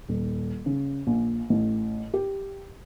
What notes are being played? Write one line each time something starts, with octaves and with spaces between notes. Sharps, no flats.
D#1
C#3
A#1
A1
G4